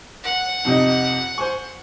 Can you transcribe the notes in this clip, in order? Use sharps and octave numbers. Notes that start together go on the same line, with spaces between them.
F#5
F2 C3 D#4
C5 G#5 C#6